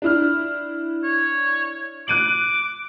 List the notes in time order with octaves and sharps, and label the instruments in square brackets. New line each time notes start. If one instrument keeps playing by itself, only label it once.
[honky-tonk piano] D4 E4 F6
[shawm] C#5
[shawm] D6 [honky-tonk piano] F#6 D#7 F#7